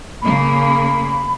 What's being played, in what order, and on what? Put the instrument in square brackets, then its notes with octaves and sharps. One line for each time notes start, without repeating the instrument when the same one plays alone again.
[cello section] C#3 A#3 [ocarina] B5